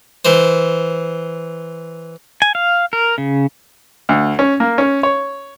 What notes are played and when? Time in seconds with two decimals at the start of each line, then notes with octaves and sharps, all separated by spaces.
0.25 E3 C5
2.42 G#5
2.55 F5
2.93 A#4
3.18 C#3
4.09 D2
4.39 C#4
4.60 A#3
4.78 C#4
5.03 C#5